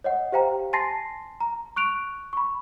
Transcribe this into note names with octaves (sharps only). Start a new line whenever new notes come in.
C#5 D#5 F#5
G4 C5 F5 G5 A#5
G#5 A5 C6 A6 A#6 C7
A#5
C#6 F#6 D7 F7
B5 C#6